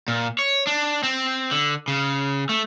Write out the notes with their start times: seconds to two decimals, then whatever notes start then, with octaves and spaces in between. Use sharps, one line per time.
0.08 A#2
0.39 C#5
0.67 D4
1.03 C4
1.51 D3
1.88 C#3
2.49 A3